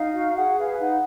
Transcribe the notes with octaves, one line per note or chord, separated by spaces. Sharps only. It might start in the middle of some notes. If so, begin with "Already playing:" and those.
Already playing: D#4 F5
F#4
G#4 F#5
B4 F5
D#4 F#5